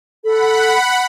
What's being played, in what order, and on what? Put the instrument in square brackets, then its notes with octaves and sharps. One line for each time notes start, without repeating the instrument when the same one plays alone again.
[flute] A4 [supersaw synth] F#5 B5